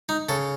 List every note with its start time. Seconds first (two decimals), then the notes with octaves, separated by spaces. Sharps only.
0.09 D#4
0.29 C#3 A4